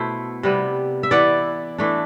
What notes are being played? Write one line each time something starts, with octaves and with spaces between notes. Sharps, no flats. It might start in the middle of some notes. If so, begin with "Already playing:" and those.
Already playing: B2 A3 E4 C5
C3 G3 B3
E5
E3 B3 E4 D5 F#5
E3 A3 D4